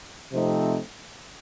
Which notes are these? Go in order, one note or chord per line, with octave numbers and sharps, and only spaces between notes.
C3 F3 A3 C4 D#4